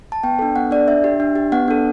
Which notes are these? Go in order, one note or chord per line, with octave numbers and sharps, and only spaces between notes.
A5
B3 G5
D4 A4
B3 F#5
D4 A4 D5
D4 E5
G4
D4
G4
B3 F#5
D4 A4